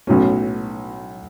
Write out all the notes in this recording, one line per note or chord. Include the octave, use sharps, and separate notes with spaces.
B1 A2 F#3 C#4